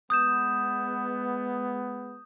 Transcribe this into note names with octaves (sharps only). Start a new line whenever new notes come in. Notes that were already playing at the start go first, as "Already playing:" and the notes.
G#3 B3 D#6 G6 E7